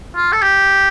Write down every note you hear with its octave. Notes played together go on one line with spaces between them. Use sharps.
F4
A4
G4